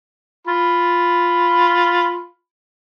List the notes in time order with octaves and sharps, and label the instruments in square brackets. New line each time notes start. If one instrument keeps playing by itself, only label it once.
[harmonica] F4 B5